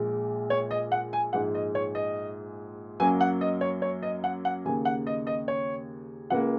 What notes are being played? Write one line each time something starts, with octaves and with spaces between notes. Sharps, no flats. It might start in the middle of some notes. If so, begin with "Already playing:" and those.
Already playing: A#1 A#2 G#3
C#5
D#5
F#5
G#5
A#1 G#2 G#3 F#5
D#5
C#5
D#5
F#2 F#3 A#3 G#5
F#5
D#5
C#5
C#5
D#5
F#5
F#5
D#2 C#3 A#3 G#5
F#5
D#5
D#5
C#5
C#2 C#3 A#3 F#5